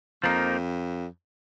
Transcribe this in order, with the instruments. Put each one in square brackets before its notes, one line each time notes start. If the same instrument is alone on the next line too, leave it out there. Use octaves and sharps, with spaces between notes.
[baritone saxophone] F2 [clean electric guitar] F3 A#3 D#4